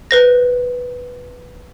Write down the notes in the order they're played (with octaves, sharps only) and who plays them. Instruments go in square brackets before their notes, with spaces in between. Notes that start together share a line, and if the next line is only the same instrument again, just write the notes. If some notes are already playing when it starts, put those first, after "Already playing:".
[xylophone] B4 C5 A#6